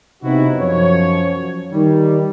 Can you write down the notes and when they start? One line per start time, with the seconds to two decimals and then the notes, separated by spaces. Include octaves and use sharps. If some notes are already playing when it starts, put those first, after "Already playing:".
0.23 C3 B3 C4 D#4 E4 F#4
0.57 F#2 F3 C#5
1.73 D#3 G3